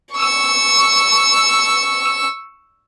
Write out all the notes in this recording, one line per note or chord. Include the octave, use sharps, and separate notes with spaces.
C#6 E6